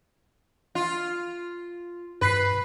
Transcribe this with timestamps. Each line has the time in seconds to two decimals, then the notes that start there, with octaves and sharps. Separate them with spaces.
0.75 F4
2.21 G2 B4 B6 C7